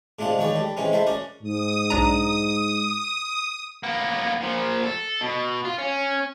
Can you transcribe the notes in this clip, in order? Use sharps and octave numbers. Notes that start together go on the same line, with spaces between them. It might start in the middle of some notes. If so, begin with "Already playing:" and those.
G#2 C3 G#3 D4 F4 F#5
E2 D#3 G#3 F#4 C#5 D5
G3 A4
C3 E3 G#3 C4 C#4
G#3 E4 A4 C5 E5
C#4 F#4 A#4 D5
G#2 D#6
B1 D4 A#5
A#3 B3
A#2 F3
A4
B2
F4
C#4